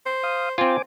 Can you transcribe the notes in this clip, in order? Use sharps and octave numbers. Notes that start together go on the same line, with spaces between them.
C5
F5 D#6
C4 F4 C5 G#5 D6